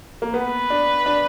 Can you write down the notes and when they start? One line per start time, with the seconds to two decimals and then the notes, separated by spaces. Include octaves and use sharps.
0.22 A#3
0.34 B3 B4
0.70 D4
1.06 D4